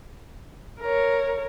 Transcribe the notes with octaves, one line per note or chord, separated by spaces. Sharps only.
A#4 C#5